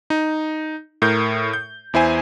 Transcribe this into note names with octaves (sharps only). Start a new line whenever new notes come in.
D#4
A2 A#4 G6
G6
E2 E4 C5 G#5